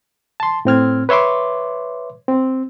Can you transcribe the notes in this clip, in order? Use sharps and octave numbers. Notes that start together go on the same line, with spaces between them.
A5 C6
A2 C4 F6 G#6
B4 C#5 E5 C6 D6
C4